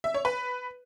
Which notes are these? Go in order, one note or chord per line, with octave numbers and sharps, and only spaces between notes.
E5
C#5
B4